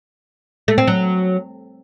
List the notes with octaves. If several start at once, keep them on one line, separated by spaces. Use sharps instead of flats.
A3
C4
F#3